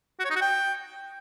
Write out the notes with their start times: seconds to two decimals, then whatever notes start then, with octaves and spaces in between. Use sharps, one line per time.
0.20 F#4
0.25 C#5
0.30 D#4
0.36 F#4
0.41 G5